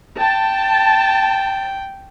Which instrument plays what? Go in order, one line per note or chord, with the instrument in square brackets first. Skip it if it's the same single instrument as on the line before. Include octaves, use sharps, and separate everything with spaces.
[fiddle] G5 [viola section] A5